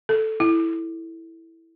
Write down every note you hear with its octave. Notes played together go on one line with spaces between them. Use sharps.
A4
E4